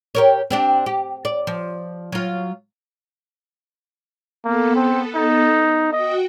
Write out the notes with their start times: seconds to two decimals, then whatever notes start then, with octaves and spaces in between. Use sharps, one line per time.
0.15 G4 A#4 C#5
0.50 C4 D4 G4
0.86 G4
1.25 D5
1.47 F3
2.12 F#3 F4
4.45 A#3 B3 A4
4.76 C4
5.16 D#4
5.93 F#4 D#5 G5